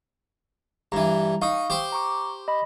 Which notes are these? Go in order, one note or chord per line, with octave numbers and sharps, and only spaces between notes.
G2 E3 A#5
D#4 F5 C#6 D#6
G4 C5
A#5 C#6 D6
D#5 B5